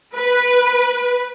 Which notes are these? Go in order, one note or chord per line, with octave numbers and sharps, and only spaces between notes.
B4